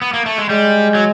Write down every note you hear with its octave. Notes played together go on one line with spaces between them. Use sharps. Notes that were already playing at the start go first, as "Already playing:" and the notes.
B3
A#3
A3
G#3
G3 G#3
F#3